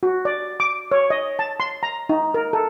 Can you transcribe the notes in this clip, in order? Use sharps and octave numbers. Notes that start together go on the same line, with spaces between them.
F#4
D5
D6
C#5
D#5
A5
C6
A#5
D#4
A#4
A4